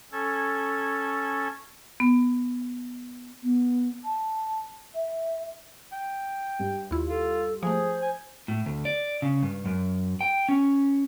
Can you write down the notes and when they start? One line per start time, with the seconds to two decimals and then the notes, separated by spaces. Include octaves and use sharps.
0.12 C#4 A4 G#6
2.00 B3
3.43 B3
4.05 A5
4.95 E5
5.92 G5
6.59 G2
6.91 D#2 E4 F4
7.09 F4 A4
7.63 F3 A3 G#4 C5
8.02 G#5
8.48 A2
8.66 D2
8.85 D5
9.22 C#3
9.42 G2
9.66 F#2
10.21 G5
10.49 C#4